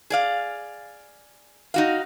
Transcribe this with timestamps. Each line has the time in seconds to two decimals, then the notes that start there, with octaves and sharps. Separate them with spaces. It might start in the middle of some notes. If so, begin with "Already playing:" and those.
0.10 G#4 D5 F5
1.74 D#4 F#4 F5